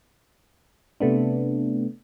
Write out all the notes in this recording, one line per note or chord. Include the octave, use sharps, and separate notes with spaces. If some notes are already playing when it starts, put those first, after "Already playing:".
C3 A3 B3 D4